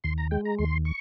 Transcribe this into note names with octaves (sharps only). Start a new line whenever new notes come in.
D#2 C6
A#5
G#3 G5
A#5
D#2 C6
C#6